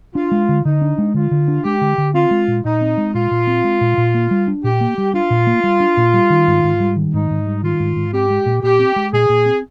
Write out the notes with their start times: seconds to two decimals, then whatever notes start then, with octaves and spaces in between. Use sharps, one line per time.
0.15 D4 F4
0.31 G#3
0.49 D3
0.65 D3 D#4
0.82 D4
0.98 G#3
1.14 D3 F4
1.31 D3
1.48 D4
1.64 G#3 G4
1.81 D3
1.98 D3
2.14 C4 F4
2.31 G#3
2.48 A#2
2.65 A#2 D#4
2.81 C4
2.98 G#3
3.14 A#2 F4
3.31 A#2
3.47 C4
3.64 G#3
3.81 A#2
3.97 A#2
4.14 A#3
4.31 G3
4.48 D4
4.64 A#2 G4
4.81 A#3
4.98 G3
5.14 D4 F4
5.30 A#2
5.47 A#3
5.64 G3
5.80 D4
5.97 A#2
6.14 G3
6.30 D#3
6.47 G#2
6.64 G#2
6.80 G3
6.96 D#3
7.14 G#2 D#4
7.30 G#2
7.46 G3
7.63 D#3 F4
7.80 G#2
7.96 G#2
8.13 C4 G4
8.30 G#3
8.46 A#2
8.62 A#2 G4
8.79 C4
8.96 G#3
9.13 A#2 G#4
9.29 A#2
9.46 C4